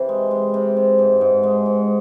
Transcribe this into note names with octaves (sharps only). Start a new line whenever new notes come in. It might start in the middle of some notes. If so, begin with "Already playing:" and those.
Already playing: C3 E3
G#3
G#3
C3
C3
G#2
G#2
G#3
G#2